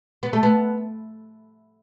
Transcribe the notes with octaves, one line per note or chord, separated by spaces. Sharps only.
B3
A3
B3